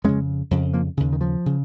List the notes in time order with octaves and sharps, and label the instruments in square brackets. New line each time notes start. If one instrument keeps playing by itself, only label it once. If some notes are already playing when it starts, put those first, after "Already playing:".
[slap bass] F2 C#3 G#3 C#4
F2 C#3
F3 A#3
D#2 C#3
D#3
F3
C#3